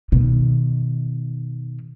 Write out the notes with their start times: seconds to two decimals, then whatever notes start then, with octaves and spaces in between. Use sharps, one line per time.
0.12 B2 D#3